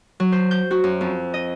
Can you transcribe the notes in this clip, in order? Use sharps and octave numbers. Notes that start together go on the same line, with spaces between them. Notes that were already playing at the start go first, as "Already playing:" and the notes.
F#3
C5
G6
F#4
F#2
F2
D#5